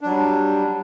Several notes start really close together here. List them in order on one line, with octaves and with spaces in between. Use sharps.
D4 F#3 G3